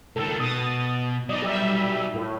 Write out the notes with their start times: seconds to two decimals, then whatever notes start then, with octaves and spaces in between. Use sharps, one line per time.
0.16 C#2 D#3 A4
0.40 B2 D#6 A6
1.29 F#3 D#4 D5 D#5
1.42 G3 E5
2.14 A2